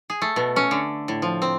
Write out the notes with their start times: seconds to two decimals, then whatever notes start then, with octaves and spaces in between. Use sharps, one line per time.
0.10 G#4
0.22 A3
0.36 B2
0.56 C#4
0.71 D3
1.08 A2
1.22 F3
1.42 C4